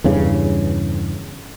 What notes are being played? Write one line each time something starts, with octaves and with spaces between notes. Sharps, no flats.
E2 G2 C#3